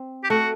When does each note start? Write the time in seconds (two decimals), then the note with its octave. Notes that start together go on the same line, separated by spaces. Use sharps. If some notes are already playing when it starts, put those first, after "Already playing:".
Already playing: C4
0.24 G4
0.30 A3 F#4